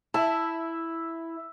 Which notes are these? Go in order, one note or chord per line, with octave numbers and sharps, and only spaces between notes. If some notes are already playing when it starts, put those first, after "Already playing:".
E4 E5 A5